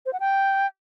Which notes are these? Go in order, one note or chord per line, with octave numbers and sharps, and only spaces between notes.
C5
F#5
G5